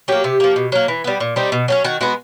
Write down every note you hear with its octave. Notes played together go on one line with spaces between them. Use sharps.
F#3 A#3 G4
C3
F3 A#3
B2
F#3 A#3
E3
G3 B3
A#2
G3 C4 D#4
B2
F#3 A3 C#4
D#3 F#4
G#3 B3 F#4